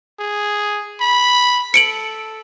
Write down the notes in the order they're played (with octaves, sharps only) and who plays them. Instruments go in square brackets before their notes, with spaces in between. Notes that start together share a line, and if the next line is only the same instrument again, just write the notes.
[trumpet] G#4
B5
[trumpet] A4 [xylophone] C#7 D7 F#7